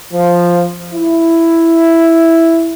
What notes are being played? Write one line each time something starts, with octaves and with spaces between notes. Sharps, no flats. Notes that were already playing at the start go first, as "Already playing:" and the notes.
F3
E4